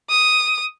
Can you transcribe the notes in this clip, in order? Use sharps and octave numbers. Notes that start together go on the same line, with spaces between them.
D#6